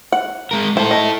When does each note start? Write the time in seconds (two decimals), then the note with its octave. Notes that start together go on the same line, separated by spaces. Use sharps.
0.12 F#5
0.51 G#3 A#4
0.77 E4 A4 C5
0.91 A3 D#5